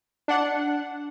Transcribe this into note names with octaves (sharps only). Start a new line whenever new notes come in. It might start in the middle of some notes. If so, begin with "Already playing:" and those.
D4 F#5